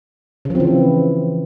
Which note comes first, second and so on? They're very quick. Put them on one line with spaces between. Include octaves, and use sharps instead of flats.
C#3 F3 C4 E3